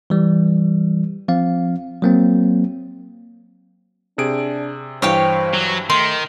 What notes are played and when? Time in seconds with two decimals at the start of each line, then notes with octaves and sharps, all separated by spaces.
0.10 E3 G3
1.28 F3 C4 F5
2.02 F#3 A#3 C4
4.18 C3 D4 G#4 D7
5.02 G2 E3 C5 C#5 F5 G5
5.54 F#3
5.90 D#3 A3 C6